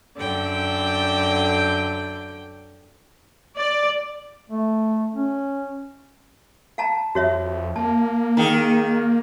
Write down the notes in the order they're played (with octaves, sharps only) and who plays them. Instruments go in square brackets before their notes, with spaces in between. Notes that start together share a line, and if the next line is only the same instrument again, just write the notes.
[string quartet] F#2 D3 D5 G5
[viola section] D5
[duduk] A3
C#4
[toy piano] F5 A5 A#5
[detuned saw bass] F2 [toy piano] F#4 C#5 E5
[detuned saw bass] A#3 [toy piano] A5
[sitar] D#3 G#4 [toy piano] G5 A#5